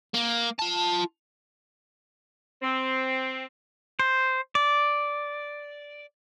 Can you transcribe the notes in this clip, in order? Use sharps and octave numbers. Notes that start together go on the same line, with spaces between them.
A#3
F4 A5
C4
C5
D5